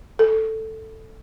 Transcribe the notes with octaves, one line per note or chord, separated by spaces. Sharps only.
A4